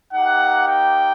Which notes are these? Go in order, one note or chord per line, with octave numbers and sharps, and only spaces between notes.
A#3 D#4 G4 F#5
G5